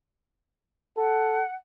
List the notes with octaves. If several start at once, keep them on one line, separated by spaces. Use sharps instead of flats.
A4 F#5